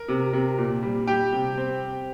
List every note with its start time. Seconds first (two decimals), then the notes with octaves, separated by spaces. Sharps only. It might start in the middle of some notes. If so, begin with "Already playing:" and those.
Already playing: A#4
0.08 C3
0.33 C3
0.58 A#2
0.83 G3
1.07 G3 G4 G5
1.32 C3
1.58 C4